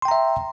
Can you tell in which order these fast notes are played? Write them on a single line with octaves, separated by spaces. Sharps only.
C6 G5 A#5 E5